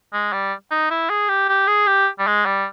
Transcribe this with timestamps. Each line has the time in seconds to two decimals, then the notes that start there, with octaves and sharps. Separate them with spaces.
0.13 G#3
0.33 G3
0.71 D#4
0.91 E4
1.10 G#4
1.29 G4
1.49 G4
1.68 G#4
1.88 G4
2.19 G3
2.27 G#3
2.46 G3